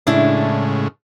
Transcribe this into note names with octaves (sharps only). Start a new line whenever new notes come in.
A2 C#3 G#3 D4 E4